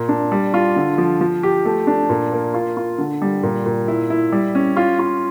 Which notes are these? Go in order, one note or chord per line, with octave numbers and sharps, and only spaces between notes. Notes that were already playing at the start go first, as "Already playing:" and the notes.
Already playing: A#2
D4
G3
F4
D3
F3
F3
G4
A3
D4
A#2
A#3
F4
F4
D3
G3
A#2
A#2
E4
E4
G3
C#4
F4
F4